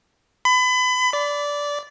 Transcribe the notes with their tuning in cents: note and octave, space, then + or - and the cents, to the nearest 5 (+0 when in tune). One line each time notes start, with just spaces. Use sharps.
B5 +30
D5 -15